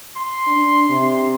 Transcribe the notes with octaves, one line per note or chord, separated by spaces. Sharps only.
C6
D4
C3